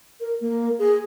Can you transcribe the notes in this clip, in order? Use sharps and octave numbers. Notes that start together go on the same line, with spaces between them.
A#4
A#3
G#4